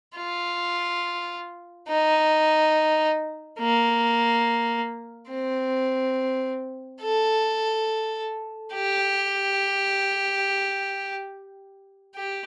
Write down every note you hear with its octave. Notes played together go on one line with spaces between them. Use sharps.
F4
D#4
A#3
C4
A4
G4
G4